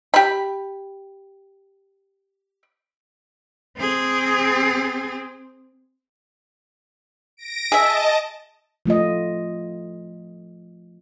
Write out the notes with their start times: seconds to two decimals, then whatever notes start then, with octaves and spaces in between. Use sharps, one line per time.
0.14 G4 B5
3.78 C4 G#4
7.37 A#6 D7
7.72 G#4 D#5 E5 A5
8.86 F3 A3 F4 D#5